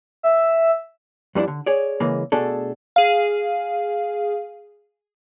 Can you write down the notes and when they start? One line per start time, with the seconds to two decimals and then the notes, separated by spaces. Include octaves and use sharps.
0.23 E5
1.35 F2 G3 C#4 D4 E4
1.48 D3
1.66 G#4 C#5 D5
2.00 C#3 E3 G#3 A#3
2.32 B2 A3 D4 G#4 A4
2.96 G#4 F5